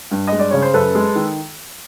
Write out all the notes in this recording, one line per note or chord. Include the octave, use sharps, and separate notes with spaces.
G2
G#3 D#5
D5
C#3 C#5
C5
F#2 A4 B4
G#3
D#3